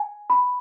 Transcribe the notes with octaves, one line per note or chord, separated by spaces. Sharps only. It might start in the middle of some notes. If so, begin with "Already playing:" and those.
Already playing: G#5
B5